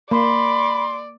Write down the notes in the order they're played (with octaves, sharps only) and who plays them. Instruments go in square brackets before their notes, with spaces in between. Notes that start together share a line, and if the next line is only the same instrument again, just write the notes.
[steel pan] A#3 [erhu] D5 [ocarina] B5 [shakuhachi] C6